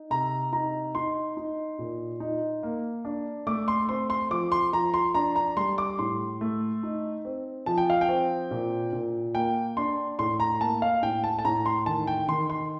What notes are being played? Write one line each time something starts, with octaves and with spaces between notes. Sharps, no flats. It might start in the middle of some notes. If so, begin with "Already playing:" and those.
Already playing: D#4
C3 A#5
D#4 A#5
D#4 C6
D#4
A#2
D#4
A#3
D4
A3 D6
C6
C4 C6
C6
F3 D6
C6
F3 A#5
C6
D4 A#5
A#5
G3 C6
D6
A2 C6
A3
D#4
C4
F3 A5
G5
F5
G5
C4
A#2
A#2
A#3 G5
D4 C6
A2 C6
A#5
A#3 A5
F5
A2 G5
A5
A5
A2 A#5
C6
D#3 A5
G5
D#3 C6
C6